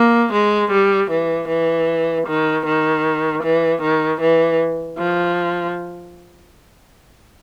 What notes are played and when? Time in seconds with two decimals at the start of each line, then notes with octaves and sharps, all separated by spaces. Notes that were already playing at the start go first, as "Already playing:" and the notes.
Already playing: A#3
0.33 G#3
0.71 G3
1.11 E3
1.48 E3
2.27 D#3
2.66 D#3
3.43 E3
3.82 D#3
4.21 E3
4.98 F3